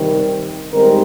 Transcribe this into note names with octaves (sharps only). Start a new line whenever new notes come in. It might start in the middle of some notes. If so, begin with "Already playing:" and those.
Already playing: C3 D#3 G3
G#2 D#3 G3 C4 D#4 A#4